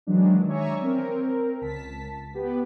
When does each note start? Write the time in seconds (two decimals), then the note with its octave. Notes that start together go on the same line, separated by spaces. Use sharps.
0.07 D#3 E3 F#3 G#3 D4
0.49 C#5 D5 E5 G#5 A#5 C#6
0.82 C4 A#4
1.61 C#2 A5 B6
2.34 B3 G4 B4